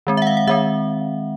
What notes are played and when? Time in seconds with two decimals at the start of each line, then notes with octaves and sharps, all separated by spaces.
0.07 D#3 G#3 C4
0.17 E5 F#5
0.27 F5
0.37 F#5
0.47 D#3 G#3 C4 E5